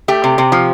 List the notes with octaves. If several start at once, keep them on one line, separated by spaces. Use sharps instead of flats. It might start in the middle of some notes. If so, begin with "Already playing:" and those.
A3 G4
C3
C3
F3